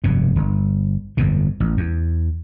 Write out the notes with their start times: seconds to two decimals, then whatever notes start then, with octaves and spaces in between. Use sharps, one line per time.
0.04 F1 G2 B2
0.36 G1
1.17 G1 F2 B2
1.60 A1
1.77 E2